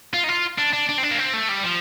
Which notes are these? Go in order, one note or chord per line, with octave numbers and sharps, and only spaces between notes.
F4
D#4
F4
D4
D4
D4
C4
D4
A#3
C4
A3
G3
F3